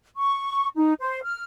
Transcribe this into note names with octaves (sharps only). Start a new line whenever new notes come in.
C#6
D#4
C5
F6